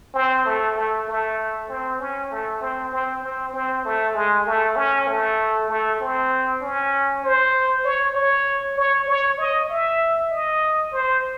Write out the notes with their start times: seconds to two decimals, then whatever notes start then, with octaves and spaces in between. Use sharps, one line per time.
0.14 C4
0.45 A3
0.76 A3
1.08 A3
1.69 C4
2.00 C#4
2.31 A3
2.61 C4
2.92 C4
3.23 C4
3.54 C4
3.85 A3
4.15 G#3
4.46 A3
4.76 C#4
5.07 A3
5.69 A3
6.00 C4
6.61 C#4
7.23 C5
7.85 C#5
8.15 C#5
8.77 C#5
9.08 C#5
9.38 D#5
9.69 E5
10.31 D#5
10.92 C5